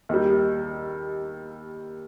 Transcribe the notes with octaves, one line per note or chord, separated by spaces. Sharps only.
D#2 D#3 G3